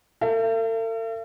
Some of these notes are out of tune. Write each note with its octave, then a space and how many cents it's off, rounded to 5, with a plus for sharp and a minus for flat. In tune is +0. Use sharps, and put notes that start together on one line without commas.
A4 +45 E5 +45